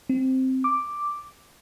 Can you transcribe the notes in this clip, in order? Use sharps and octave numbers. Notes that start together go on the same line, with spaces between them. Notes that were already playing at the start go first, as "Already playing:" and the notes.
C4
D6